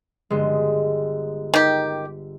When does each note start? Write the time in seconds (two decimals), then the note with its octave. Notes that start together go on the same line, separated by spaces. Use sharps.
0.30 G1 G#3
1.54 D#3 G4